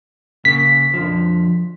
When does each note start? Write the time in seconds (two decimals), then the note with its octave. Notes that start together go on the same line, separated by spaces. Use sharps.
0.45 C#3 A#3 B6
0.94 F2 D3 F3